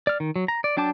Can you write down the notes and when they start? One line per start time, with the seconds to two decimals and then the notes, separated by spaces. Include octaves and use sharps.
0.07 D5 F6
0.20 D#3
0.36 F#3
0.48 A#5
0.64 D5
0.77 F#3 D4 G5 A5 D6